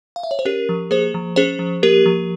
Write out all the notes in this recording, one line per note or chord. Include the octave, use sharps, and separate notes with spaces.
F5
E5
C#5
C5
C#4 G4 A#4
F3
A#3 G#4 C5
F3
C#4 G#4 C5
F3
A#3 G4 A#4
F3